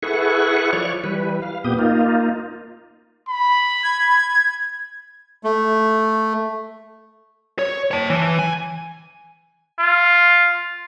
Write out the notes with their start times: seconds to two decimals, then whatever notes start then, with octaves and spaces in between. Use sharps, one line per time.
0.03 E4 G#4 A4 B4 F#5 C#6
0.73 F3 C#5 D5 C#6
1.04 E3 G3 B4
1.42 F5
1.64 A#2 B3 G4 D#6
1.79 A#3 D#4 F4
3.28 B5
3.83 G#6
5.43 A3
7.59 C#5
7.91 C#5 A5
8.10 E3
8.39 G#5
9.79 F4